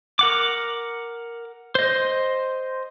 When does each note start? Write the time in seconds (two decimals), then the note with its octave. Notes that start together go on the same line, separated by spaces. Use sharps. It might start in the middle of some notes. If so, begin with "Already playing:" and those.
0.19 A#4 F#5 D6
1.75 C5 D#5